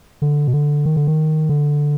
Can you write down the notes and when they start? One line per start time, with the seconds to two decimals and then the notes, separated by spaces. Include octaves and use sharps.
0.22 D3
0.48 B2
0.53 D3
0.86 D#3
0.96 D3
1.07 D#3
1.49 D3